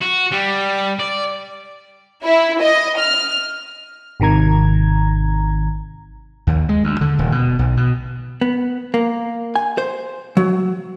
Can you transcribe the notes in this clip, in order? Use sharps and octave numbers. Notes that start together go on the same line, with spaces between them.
F#4
G3
D5
E4
D#5
F6
G#1 C3 D#3 A#5 G#6
D#2
G#3
D2
D3
D#1
B2
B1
B2
B3
A#3
G#5
C5
F#3